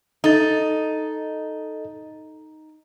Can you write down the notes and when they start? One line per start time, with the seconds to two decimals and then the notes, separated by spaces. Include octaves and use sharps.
0.24 D#4 A4 D#5 A6